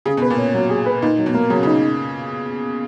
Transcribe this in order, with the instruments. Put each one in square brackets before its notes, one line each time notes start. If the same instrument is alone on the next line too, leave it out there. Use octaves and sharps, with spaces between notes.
[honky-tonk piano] C#3 [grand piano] G#4
[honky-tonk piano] B2
[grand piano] B4
[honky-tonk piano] A#2
[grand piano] C#4
F#3
G#4
B4
[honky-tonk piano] A#2 [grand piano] D#4
[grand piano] F#3
[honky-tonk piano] B2
[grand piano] A#3
[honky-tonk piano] C#3 [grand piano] F#3
[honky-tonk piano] C#3
[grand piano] D#4